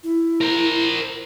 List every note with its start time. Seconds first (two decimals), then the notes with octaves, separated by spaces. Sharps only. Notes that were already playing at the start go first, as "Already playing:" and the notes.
0.03 E4
0.41 A#4 C5